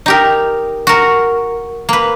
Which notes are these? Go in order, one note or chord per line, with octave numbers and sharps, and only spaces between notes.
D#4 G4 A#4
F#4 A#4
A#3 B4